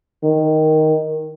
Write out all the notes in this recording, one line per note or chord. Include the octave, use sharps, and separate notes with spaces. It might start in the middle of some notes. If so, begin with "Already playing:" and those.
D#3